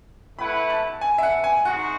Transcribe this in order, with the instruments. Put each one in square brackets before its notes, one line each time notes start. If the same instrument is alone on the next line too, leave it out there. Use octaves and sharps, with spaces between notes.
[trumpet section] A3 E4 B4 F#5 [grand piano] B5
[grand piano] A5
G#5
E5
F#5
G#5
[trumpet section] G#3 D#4 F#4 [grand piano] F#5